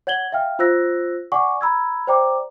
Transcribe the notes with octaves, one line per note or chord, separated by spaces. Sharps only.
C#5 F#5 G#6 F#7 G7
E5 F5 G5 F6
F4 C5 E6 F#6 A#6
D5 F#5 G#5 C#6 D6
A#5 B5 E6 G#6
C5 D5 G5 A#5 D6